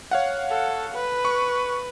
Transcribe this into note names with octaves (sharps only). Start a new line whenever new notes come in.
C#5 F5 F#5
A4
B4
C#6